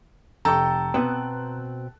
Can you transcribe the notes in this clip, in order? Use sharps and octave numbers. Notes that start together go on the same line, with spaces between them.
F1 A4 G5 A#5 C#6
B2 B3 C4 F#6